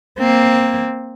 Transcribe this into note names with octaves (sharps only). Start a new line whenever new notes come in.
A#3 C4